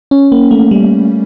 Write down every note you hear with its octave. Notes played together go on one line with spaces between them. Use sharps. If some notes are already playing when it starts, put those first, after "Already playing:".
C#4
A#3
A3
G3